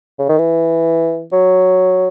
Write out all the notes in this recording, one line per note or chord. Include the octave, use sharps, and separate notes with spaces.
C#3
D#3
E3
F#3